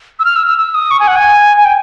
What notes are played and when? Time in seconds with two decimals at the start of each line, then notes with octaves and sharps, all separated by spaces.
0.19 E6
0.25 F6
0.36 E6
0.47 E6
0.58 E6
0.75 D#6
0.91 C#6
1.00 G#5
1.08 F#5
1.16 G#5
1.57 G#5
1.65 G5